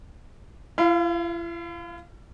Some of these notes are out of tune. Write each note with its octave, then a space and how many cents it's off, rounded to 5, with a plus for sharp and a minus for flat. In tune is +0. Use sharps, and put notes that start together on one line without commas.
E4 +45 F5 -5